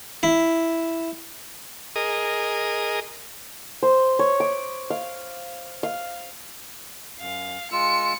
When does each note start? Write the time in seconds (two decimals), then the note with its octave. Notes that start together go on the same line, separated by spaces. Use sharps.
0.23 E4
1.96 G#4 A#4 D#5
3.83 C5
4.19 C#5
4.40 D6
4.90 F5
5.83 F5
7.20 F#2 F5
7.72 G#3 F4 E6 C#7